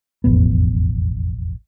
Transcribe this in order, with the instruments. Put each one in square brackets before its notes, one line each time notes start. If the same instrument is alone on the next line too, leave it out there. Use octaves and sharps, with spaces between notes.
[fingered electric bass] E1 A1 F2 B3